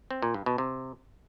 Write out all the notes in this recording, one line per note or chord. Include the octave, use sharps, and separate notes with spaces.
C4
A#2
G2
B2
C3